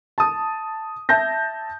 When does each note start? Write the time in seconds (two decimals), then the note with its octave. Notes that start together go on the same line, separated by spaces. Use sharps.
0.18 A5 D#6
1.09 E5 A5 G6 A#6